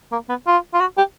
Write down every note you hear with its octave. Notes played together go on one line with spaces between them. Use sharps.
A#3
B3
F4
F4
F#4
G4